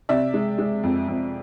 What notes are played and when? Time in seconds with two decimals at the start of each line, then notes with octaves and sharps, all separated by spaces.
0.09 C3 D5 E5
0.34 G#3
0.58 G#3
0.83 F2
1.08 F2